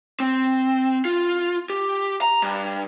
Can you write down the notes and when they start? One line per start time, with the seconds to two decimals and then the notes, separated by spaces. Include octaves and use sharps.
0.20 C4
1.05 F4
1.70 G4
2.21 A#5
2.42 G2